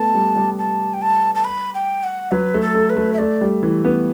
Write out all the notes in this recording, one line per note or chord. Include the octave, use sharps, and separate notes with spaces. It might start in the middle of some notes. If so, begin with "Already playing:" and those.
Already playing: A3 B3 A5
G3
G3
A5
G5
A5
A5
B5
G5
F#5
F#3 B4
A3
A4
A3
B4
A3
E5
A3 D5
G3
E3
B3